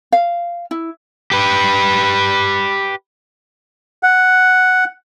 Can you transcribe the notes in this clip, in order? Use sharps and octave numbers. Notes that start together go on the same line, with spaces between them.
F5
E4
G4 B4
F#5